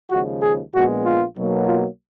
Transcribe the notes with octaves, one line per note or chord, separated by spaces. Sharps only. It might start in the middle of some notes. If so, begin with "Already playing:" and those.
D#2 C#3 F3 G#3 F#4
G#4
A#1 A#2 G#3 B3 F#4
F4
B1 B2 F#3 A#3
F4